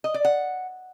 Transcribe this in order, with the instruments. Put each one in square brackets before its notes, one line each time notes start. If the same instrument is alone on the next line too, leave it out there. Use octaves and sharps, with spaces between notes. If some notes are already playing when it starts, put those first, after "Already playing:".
[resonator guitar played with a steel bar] D#5
D5
F#5